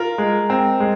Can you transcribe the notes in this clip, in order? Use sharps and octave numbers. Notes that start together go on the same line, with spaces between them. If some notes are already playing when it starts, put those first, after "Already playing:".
Already playing: F4 A#4
G#3
C4
G#3